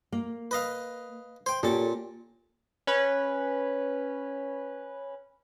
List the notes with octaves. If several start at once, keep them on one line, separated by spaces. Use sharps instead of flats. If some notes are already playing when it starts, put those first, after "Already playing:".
A#3
B4 D#5 F5
C5 G5
A#2 C#4 G4 A4 A5
C#4 B4